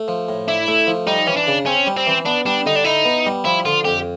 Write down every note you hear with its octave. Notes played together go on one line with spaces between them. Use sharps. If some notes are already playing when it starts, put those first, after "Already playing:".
Already playing: A3
F3
A2
D4 E4
A3
F3
G3 D#4
E3 C#4
D4
C#3
C4 C#4
G3
C4
E3
B3 D4
G3 D4
D3 D#4
D4
D#4 E4
B3
G3
F3 E4
D3 F4
F2 G4